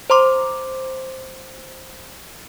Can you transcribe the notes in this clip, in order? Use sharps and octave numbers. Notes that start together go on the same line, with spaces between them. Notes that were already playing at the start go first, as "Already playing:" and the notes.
C5 A#5 C6 D6